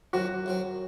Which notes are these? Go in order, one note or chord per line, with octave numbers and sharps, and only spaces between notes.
F#2 F#3 C4 F#4
F#2 F#3 C4